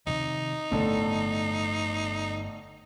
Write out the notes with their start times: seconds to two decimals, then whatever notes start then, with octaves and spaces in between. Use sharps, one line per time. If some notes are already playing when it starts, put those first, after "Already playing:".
0.07 C3 D#3 F3 D#4
0.71 G1 A2 D3 F3 B3 A4